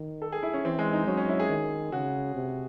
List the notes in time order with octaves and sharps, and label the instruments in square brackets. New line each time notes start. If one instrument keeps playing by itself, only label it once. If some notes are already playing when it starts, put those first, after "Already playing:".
Already playing: [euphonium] D#3
[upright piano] A4
G#4
E4
C#4
[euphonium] E3 [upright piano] C4
[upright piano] G#3
D#4
[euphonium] F#3 [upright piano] C#4
[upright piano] C#4
E4
G#4
[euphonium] D#3
[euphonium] C#3 [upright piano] F#4
[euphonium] C3